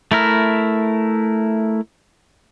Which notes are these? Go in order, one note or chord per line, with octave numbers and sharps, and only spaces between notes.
A3 E4 A#4